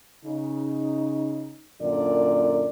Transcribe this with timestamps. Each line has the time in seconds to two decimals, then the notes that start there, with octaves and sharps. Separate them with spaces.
0.25 C#3 D#4
1.81 F#2 A#2 D3 D5